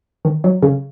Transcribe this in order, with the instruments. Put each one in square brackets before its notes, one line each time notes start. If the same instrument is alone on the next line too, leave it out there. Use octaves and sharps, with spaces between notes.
[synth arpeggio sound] D#3
F#3
C#3